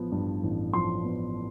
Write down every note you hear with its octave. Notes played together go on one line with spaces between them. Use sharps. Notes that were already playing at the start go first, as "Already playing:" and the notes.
Already playing: A1 F3 B3
G2
A1
F3 C6
B3